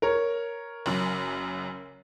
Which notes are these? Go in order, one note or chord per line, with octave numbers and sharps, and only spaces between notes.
A#4 C#5
F#1 F#2